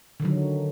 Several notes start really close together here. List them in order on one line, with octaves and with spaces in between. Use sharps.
D3 D#3 F#3